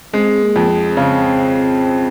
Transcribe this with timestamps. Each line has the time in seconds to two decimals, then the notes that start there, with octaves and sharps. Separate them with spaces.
0.13 G#3 C4
0.42 A#3
0.56 F2
0.70 C4
0.97 C#3